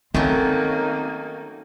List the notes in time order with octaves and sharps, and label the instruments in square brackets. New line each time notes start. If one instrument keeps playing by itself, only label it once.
[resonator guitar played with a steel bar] D#3 [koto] F#3 A3 C#4 [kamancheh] A#3 D#4 [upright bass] C4